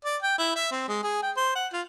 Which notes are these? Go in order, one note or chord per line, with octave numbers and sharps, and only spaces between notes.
D5
G5
E4
E5
C4
G#3
G#4
G5
C5
F#5
F4